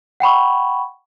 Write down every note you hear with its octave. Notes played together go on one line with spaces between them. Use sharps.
F#5 G5 B5 C#6